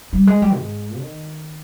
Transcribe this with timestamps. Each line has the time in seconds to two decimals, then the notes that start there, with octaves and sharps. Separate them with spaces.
0.13 G3
0.27 G#3
0.42 G3
0.57 G#2
1.00 D#3